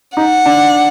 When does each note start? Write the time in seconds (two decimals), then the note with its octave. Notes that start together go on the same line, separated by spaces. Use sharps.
0.17 D#4 F#5
0.46 D4